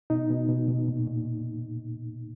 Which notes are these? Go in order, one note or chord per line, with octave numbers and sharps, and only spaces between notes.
B2 D#4
B2
B2
B2
A#2
A#2